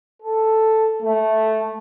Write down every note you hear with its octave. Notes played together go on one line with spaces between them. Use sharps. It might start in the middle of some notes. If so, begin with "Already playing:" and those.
A4
A3